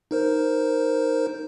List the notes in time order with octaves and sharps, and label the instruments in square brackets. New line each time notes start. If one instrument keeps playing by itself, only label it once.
[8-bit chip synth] D#4 A#4 C5